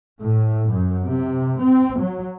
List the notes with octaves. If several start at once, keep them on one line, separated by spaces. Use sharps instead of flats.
A2
F#2
C3
C4
F#3